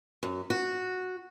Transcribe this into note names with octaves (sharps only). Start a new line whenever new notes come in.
F#2
F#4